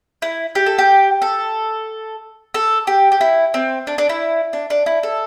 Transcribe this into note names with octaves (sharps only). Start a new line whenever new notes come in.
E4
G4
A4
G4
A4
A4
G4
G4
E4
C4
D4
D4
E4
D4
D4
E4
A4